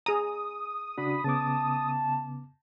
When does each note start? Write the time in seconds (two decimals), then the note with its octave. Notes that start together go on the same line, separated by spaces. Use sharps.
0.06 G#4 A#5 D#6
0.98 C#3 D4 F#4 B5
1.24 C#3 B3 A5 D6